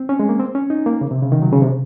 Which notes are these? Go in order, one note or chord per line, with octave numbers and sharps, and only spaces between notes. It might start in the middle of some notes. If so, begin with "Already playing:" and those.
Already playing: C4
C#4
G#3
A#3
C4
C#4
D#4
A#3
C#3
C3
C#3
D#3
F#3
C#3
C3